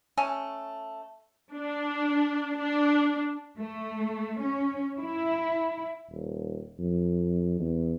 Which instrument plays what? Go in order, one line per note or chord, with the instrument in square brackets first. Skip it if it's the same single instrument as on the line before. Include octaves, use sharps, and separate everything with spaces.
[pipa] A3 C#4 A4 G#5
[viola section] D4
D4
[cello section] A3
C#4
E4
[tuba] D#1
F2
E2